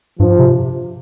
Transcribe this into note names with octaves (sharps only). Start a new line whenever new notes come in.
G2 F3
C3